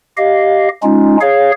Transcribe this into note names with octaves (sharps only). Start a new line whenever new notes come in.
G4 D#5 F5
G#3 C#4 D#4 F4
G#4 C#5 F5